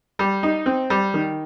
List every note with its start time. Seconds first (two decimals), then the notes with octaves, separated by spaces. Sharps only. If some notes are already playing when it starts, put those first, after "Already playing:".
0.19 G3
0.43 D#4
0.66 C4
0.90 G3
1.14 D#3